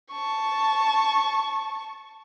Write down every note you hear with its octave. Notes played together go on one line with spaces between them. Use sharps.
A5 C#6